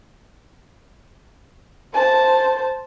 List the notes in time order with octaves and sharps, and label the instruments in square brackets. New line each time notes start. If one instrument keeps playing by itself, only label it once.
[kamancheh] C5 A5